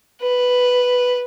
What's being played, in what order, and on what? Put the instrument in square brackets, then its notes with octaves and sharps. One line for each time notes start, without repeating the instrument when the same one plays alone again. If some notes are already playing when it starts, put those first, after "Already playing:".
[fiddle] B4